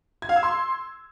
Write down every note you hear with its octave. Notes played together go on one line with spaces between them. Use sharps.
G#6
F5
E6
C6